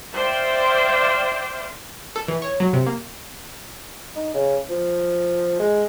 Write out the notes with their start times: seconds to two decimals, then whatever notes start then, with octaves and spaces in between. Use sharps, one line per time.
0.13 C5 D5 E5 F5 G5
2.16 A4
2.28 E3
2.42 C#5
2.60 F#3
2.73 C3
2.87 A#3
4.16 D#4
4.34 C#3
4.70 F3
5.59 G#3